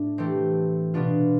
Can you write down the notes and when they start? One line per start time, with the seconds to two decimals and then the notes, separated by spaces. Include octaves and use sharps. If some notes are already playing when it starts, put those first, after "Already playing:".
Already playing: A2 D4
0.18 E3 A3 C4 G4
0.94 B2 B3 D4 F4